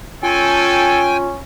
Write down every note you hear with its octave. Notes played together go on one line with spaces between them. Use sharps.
A3 C#4 F4 A4 G5 G#5